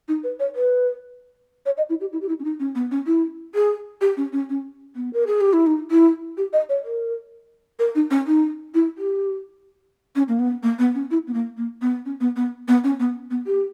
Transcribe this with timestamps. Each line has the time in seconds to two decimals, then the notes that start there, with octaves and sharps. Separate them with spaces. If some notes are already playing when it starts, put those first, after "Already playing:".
0.08 D#4
0.24 B4
0.40 C#5
0.55 B4
1.66 C#5
1.77 D#5
1.90 E4
2.01 G4
2.13 E4
2.21 G4
2.28 E4
2.39 C#4
2.44 D#4
2.60 C#4
2.75 B3
2.91 C#4
3.07 E4
3.55 G#4
4.01 G4
4.17 C#4
4.32 C#4
4.49 C#4
4.96 B3
5.13 A#4
5.27 G#4
5.41 G4
5.53 E4
5.66 D#4
5.91 E4
6.37 G4
6.53 D#5
6.69 C#5
6.85 A#4
7.79 A#4
7.95 D#4
8.11 C#4
8.27 D#4
8.74 E4
8.98 G4
10.15 C#4
10.28 A#3
10.39 B3
10.63 A#3
10.79 B3
10.95 C#4
11.11 E4
11.27 B3
11.34 A#3
11.57 A#3
11.81 B3
12.05 C#4
12.21 B3
12.36 B3
12.68 B3
12.84 C#4
12.99 B3
13.30 B3
13.46 G4